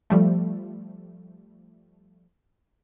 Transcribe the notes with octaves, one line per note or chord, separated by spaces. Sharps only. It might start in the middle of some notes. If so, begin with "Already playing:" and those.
F3 G3 A3